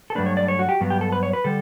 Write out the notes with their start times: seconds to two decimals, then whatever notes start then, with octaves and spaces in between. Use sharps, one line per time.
0.10 A4
0.15 G2 F#3 A3 D4 B4
0.26 C#5
0.37 D5
0.48 C#5
0.59 F#4
0.69 G4
0.81 G2 F#3 B3
0.90 G4
1.01 A4
1.12 B4
1.23 C#5
1.33 B4
1.44 D3 G3 A4